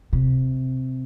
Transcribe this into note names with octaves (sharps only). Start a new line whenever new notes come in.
C3